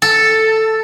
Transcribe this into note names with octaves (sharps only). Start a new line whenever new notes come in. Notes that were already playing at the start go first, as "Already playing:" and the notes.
A4